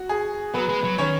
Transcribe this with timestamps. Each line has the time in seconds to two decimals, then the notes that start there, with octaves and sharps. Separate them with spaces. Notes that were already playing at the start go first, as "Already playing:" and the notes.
Already playing: F#4
0.09 G#4
0.54 F#3 B3 B4
0.69 G#3
0.84 F#3
0.98 D#3 C#4 C#5